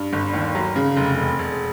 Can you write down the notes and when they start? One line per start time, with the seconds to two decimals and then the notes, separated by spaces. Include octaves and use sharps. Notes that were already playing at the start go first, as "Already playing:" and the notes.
Already playing: G2
0.13 G1
0.34 D#2
0.55 F#3
0.76 C#3
0.97 F1
1.18 E1
1.39 E1